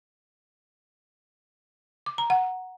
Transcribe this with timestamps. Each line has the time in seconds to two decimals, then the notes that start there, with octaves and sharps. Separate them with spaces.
2.06 D6
2.18 A#5
2.30 F#5